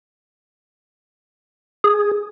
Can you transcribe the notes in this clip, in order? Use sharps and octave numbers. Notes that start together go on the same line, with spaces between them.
G#4